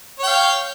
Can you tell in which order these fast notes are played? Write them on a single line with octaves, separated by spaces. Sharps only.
C#5 G5 F5